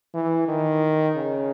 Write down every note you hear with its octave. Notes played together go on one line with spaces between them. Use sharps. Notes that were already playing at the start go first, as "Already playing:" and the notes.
E3
D#3
C#3